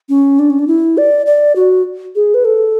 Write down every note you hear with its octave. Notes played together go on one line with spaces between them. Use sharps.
C#4
D4
C#4
D4
E4
D5
D5
F#4
G#4
B4
A4